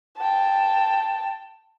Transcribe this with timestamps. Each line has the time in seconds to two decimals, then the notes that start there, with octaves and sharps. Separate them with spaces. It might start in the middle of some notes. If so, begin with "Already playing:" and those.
0.18 G5 A5